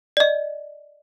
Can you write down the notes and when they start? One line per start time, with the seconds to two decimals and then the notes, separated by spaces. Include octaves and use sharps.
0.17 D5 D#5